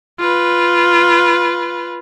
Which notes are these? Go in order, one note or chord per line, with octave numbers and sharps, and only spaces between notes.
F4 B4